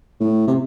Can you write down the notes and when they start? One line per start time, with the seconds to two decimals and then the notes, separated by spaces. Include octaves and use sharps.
0.20 A2
0.47 C3